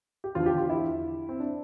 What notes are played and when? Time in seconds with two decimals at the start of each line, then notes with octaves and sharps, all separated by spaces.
0.24 G4
0.35 E2 D3 F3 F4
0.46 G4
0.58 F4
0.70 E4
1.29 C4
1.40 D4